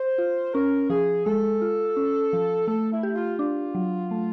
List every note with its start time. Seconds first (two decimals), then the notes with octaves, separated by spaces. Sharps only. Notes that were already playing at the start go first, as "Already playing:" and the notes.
Already playing: C5
0.18 F4
0.54 C#4 A#4
0.90 F3 G#4
1.26 G#3 A4
1.62 F4
1.96 C#4
2.33 F3
2.68 A3 A4
2.92 E4
3.03 G4
3.16 F4
3.39 D4 F4
3.75 F#3
4.11 A3